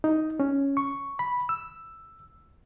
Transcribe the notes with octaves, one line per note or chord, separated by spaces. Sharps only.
D#4
C#4
C#6
B5
E6